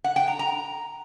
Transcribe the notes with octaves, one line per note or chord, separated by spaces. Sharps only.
F#5
G5
A#5
A#5